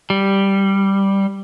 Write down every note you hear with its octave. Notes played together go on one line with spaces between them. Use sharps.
G3